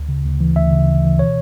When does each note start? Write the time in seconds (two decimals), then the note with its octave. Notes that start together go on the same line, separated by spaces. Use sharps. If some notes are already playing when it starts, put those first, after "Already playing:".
Already playing: D2
0.08 C#3
0.25 D2
0.41 E3
0.56 D2 E5
0.72 C#3
0.88 D2
1.04 E3
1.19 B2 C#5